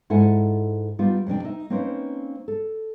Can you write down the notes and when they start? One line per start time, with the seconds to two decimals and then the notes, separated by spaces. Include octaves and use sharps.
0.10 G#2 E4 A4 F#5 G#5
0.99 G3 B3 D#4 F4
1.27 F2 C3 D4 G5
1.44 D#4 D#5 E5
1.70 A#3 C4 C#4 D#4 B4 C5
2.48 A4